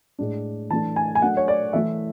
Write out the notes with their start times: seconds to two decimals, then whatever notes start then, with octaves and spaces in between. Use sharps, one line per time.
0.19 A2 G#3 D4
0.70 E3 A3 D4 A5
0.96 G#5
1.15 G#5
1.22 F#3 A3 D4 F#5
1.37 C#5
1.48 D5
1.73 E3 A3 E4 E5